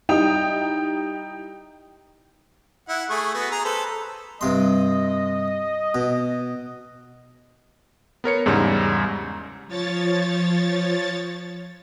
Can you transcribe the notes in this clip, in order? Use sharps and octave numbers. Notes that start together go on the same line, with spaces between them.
G3 D#4 E4 G5 D#6 F7
E4 F#5
A3 G#4 C#6
B3 F#4
G#4 A#5
A4 B4 C5
G2 C3 D#5 C6
B2
B3 A#4 C#5 C#7
E2 G#2 C#3 G3 A#5
F3 C#5 A6